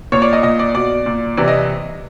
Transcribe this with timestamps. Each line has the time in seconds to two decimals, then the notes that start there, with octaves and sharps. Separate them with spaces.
0.12 A#2 C#5
0.22 D5
0.33 D#5
0.43 A#2 D#5
0.59 D5
0.74 B2 D5
1.06 A#2
1.37 C3 E3 D5
1.48 D#5